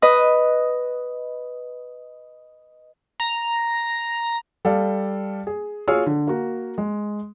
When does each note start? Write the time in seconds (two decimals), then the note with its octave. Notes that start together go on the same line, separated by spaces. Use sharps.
0.02 B4 D#5 D#6
3.20 A#5
4.65 G3 A4 D5 F5
5.47 G#4
5.88 F4 F#4 G#4 C#5 E6 F6
6.06 D3
6.27 A#3 F#4
6.78 G#3